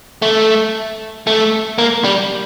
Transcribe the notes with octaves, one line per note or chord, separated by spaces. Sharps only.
A3
A3
A#3
G3